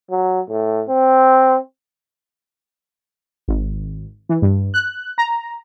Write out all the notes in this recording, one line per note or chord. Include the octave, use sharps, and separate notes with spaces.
F#3
A2
C4
G#1
E3
G2
F#6
A#5